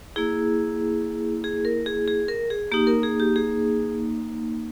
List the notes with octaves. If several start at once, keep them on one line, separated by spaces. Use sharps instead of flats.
A#3 E4 G#4
G#4
A#4
G#4
G#4
A#4
G#4
A#3 D#4 G4
A#4
G#4
G4
G#4